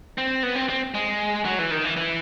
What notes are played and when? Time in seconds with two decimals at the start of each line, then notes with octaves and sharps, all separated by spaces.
0.18 C4
0.43 B3
0.56 C4
0.69 C4
0.94 G#3
1.45 F#3
1.59 E3
1.71 D#3
1.84 E3
1.97 E3